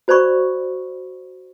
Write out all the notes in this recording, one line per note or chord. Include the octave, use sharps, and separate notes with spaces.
F#4 C5 D5 B5 C#6